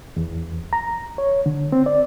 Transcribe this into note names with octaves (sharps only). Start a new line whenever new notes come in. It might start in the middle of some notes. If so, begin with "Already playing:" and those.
E2
A#5
C#5
D3
C4
D5